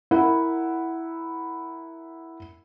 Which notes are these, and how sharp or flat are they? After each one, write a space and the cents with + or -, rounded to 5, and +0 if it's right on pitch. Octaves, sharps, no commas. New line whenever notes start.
E4 +0 A#4 -10 F#5 +5